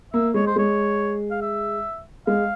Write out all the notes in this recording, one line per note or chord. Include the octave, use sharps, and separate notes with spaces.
A#3 E5
G#3 C#5
C5
G#3 C#5
F5
E5
G#3 F5